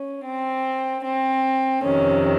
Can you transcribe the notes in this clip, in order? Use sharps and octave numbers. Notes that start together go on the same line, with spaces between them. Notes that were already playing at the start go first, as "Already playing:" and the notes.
Already playing: C#4
C4
C4
F2 C3 D#3 C#4